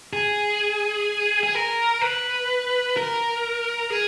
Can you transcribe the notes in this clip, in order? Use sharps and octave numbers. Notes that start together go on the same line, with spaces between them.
G#4
G#4
A#4
B4
A#4
G#4